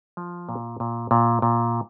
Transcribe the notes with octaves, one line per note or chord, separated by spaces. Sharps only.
F3
A#2
A#2
A#2
A#2